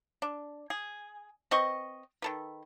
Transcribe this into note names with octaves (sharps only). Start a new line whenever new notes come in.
D4
G#4
C4 B4 D#5 C#6
D#3 A4 B4